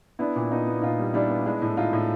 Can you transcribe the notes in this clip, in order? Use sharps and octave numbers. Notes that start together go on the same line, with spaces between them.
B3 D4 E4
A#2
B3 D#4 F4
B3
A#2 D#4 F4
G3
G3 D4 E4
B3
G#3 D4 E4
A2
G#3 D#4 F4
A2